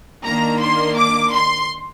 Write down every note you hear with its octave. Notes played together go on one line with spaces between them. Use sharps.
D#3 A#3 D4 A#5
C6
D6
C6